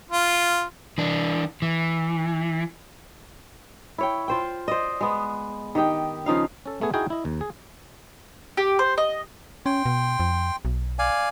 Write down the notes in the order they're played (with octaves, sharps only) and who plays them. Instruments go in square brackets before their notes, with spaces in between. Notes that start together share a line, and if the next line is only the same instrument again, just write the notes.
[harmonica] F4
[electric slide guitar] E3 D4
E3
[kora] E4 C#5 G5
F4 C5 G5
C5 D5 D#5
G#3 B3
D#3 G4 D#5 G5
C#3 F3 D#4 F5
[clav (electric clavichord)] C#4 A4
A3 B3 G#4
D#4 E4 F#4 G#4 G5
E4 D#5
D#2
G#4
[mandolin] G4
C5
D#5
[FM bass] C#4 [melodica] G5 C6
[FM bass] B2
F2
B1
[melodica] D5 F5 G#5